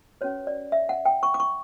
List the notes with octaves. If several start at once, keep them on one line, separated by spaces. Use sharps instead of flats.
C#4 F#4 B4 C#5
D5
E5
F#5
G5
C#6
D6
C#6